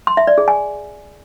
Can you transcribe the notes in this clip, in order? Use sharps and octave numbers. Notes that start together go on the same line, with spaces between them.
C6
E5
D5
G#4
G#5